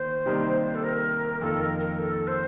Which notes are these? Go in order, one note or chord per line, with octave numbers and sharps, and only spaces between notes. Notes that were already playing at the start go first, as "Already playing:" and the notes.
Already playing: D#3 A#3 C5
C3 D#3 G3 A#3 D#4
A4
A#4
F2 D#3 A#3 F4 A4
A#4
A#4
A4
C5